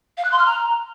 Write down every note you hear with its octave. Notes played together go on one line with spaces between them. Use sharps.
F5
F#6
C6
F6
A#5